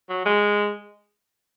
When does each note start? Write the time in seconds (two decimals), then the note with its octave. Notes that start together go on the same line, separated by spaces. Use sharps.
0.09 F#3
0.25 G#3